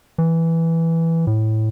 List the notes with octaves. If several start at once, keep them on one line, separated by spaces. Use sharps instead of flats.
E3
A2